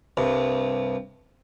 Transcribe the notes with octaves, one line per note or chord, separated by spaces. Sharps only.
C2 G2